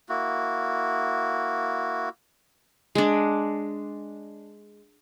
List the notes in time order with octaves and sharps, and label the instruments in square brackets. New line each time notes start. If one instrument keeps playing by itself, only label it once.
[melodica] A#3 E4 F#4
[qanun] G#3 D4